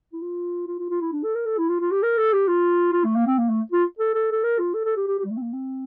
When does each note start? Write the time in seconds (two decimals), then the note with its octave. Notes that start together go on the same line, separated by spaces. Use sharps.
0.13 E4
0.22 F4
0.67 F4
0.79 F4
0.90 F4
1.01 E4
1.12 D4
1.24 A4
1.36 A#4
1.46 A4
1.58 E4
1.69 F4
1.80 F4
1.91 G4
2.03 A#4
2.18 A4
2.33 G4
2.48 F4
2.93 F4
3.04 A3
3.16 A#3
3.27 C4
3.38 A#3
3.49 A3
3.72 F4
3.99 A4
4.14 A4
4.32 A4
4.44 A#4
4.59 F4
4.74 A4
4.85 A4
4.97 G4
5.08 G4
5.19 G4
5.25 G3
5.31 A3
5.37 C4
5.42 A#3
5.53 C4